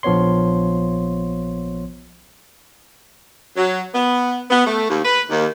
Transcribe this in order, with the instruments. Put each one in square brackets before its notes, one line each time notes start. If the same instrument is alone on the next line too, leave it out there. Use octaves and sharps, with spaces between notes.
[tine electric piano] A#1 F3 B3 C#5 C6
[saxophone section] F#3
B3
B3
A3
D#2
B4
D#2